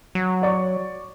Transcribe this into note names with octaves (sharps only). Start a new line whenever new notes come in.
F#3
C#5 D5 C#6